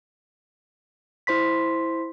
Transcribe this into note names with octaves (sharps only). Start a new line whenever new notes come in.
E4 C5 C6 B6